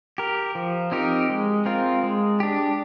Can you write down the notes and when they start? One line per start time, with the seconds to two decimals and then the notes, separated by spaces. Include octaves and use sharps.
0.18 G4 A#4
0.55 F3
0.92 C4 D#4 G4 A#4
1.30 G#3
1.66 C4 F4 A#4
2.03 G#3
2.40 D4 G4